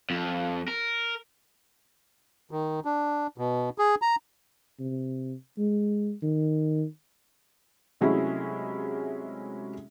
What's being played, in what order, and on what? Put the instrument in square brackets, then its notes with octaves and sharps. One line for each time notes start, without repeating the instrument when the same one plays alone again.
[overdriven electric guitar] F2
A#4
[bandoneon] D#3
D4
B2
G#4
A#5
[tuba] C3
G#3
D#3
[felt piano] C3 F#3 G#3 A3 C#4 E4